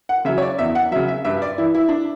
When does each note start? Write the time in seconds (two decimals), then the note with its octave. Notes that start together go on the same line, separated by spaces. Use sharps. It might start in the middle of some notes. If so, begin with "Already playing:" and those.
0.09 F#5
0.25 C#3 E5
0.29 F#3
0.38 C#5
0.42 D5
0.59 E2 E5
0.75 F#5
0.91 F#3 E5
0.96 C#3
1.08 E5
1.25 G2 E5
1.42 D5
1.58 E3 E4
1.75 E4
1.89 D4